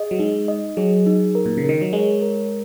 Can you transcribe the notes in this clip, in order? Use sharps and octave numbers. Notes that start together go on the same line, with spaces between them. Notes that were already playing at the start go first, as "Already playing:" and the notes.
Already playing: G#4 D#5
F#3
G#3 D#4
D#5
F#3 G#4
D#4
A#4
A#2
C#3
A#4
D#3
F#3
G#3 C#5
A#4